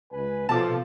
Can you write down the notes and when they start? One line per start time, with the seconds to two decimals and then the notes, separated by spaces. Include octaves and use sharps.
0.12 C#2 B4 G#5
0.49 B2 F3 A4 A5 D6